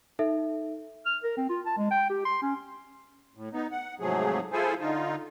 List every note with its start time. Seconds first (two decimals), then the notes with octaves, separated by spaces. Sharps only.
0.19 D#4 A4 E5
1.06 F6
1.23 A#4
1.37 C4
1.49 F4
1.66 A5
1.78 G#3
1.91 G5
2.10 G4
2.25 C6
2.42 C#4
3.35 A2
3.53 B3 D#4
3.71 F#5
4.00 G#2 C3 F3 F#3 A3 G#4
4.52 E4 F4 G#4 A4 C5 G#5
4.80 D3 D#4 F4